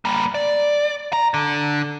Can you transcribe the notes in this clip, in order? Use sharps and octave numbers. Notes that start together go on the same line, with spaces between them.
G3 A#3
D5
A#5
D3